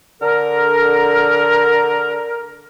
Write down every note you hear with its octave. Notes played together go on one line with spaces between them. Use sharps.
D3 A#4